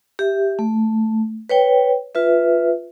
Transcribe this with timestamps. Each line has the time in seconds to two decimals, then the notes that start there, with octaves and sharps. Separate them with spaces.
0.19 G4 E5
0.59 A3
1.49 B4 C#5 G5
2.15 F4 B4 E5